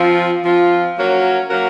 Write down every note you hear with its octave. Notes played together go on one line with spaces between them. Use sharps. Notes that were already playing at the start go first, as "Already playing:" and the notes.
Already playing: F3 C4 F4
F3 C4 F4
F#3 A#3 C#4 F#4 A#4
F#3 A#3 C#4 F#4 A#4